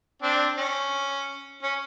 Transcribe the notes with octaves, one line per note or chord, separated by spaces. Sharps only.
C4 D4
C#4
C#4